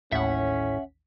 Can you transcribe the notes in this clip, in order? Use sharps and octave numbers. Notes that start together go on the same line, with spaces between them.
A1 D#2 A2 C#4 E5 F#5 B6